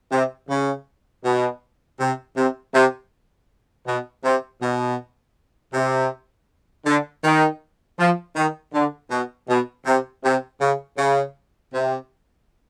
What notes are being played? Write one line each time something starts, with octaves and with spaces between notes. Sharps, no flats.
C3
C#3
B2
C3
C3
C3
B2
C3
B2
C3
D3
D#3
F3
D#3
D3
B2
B2
C3
C3
C#3
C#3
C3